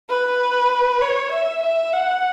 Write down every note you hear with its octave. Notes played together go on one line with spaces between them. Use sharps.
B4
C#5
E5
E5
F#5